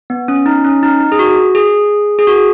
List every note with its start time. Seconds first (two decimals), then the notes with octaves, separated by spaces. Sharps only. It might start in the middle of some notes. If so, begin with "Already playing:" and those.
0.10 B3
0.28 C#4
0.46 D#4
0.65 C#4
0.83 D#4
1.01 D#4
1.12 G#4
1.19 F#4
1.55 G#4
2.19 G#4
2.27 F#4